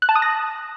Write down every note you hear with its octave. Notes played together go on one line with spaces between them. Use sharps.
F#6
A5
D#6
A#6